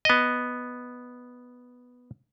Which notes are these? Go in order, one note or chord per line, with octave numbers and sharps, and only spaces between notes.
B3 D#5